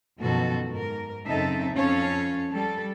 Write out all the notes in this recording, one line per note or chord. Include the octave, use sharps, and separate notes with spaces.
F#2 B2 D#3 F3 F#4 A4
G#2 A#4
F#2 C#3 C4 D#4 A4 E5
F2 C#4 A4 C#5 F5
G3 A4